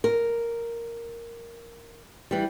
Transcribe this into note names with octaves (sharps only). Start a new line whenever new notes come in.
A#4
E3 G3